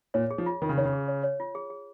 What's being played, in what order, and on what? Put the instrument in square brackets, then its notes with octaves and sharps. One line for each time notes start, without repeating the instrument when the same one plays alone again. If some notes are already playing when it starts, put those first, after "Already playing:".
[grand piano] A#2 [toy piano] C#5
[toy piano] G#4
[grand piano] F3
[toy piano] F4
[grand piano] D#3 [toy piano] F4
[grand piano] C#3
[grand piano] D#3 [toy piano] C#5
[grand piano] C#3
[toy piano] G#4
C#5
C#5
F4
G#4
G#4